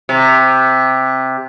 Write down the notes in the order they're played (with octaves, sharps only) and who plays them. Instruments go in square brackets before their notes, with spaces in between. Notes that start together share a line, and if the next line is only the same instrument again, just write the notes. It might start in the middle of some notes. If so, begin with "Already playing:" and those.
[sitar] C3